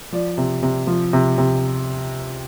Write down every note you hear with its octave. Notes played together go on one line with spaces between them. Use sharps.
F3 D5
C3
C3
F3
C3
C3